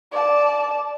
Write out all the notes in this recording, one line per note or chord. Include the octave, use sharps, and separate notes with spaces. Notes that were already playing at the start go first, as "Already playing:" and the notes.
D5 A5